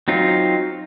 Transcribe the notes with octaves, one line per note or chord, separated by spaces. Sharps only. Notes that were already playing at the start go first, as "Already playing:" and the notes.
F#3 C4 D#4 F4